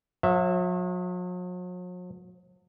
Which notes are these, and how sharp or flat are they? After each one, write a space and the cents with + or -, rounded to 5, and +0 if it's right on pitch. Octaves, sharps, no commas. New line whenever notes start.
F#3 -45 E5 +0